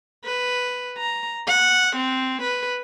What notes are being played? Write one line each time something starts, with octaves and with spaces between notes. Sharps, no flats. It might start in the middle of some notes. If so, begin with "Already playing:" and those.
B4
A#5
F#5
C4
B4